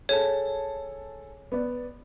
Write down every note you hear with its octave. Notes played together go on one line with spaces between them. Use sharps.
G#4 A4 C#5 A5
B3 D5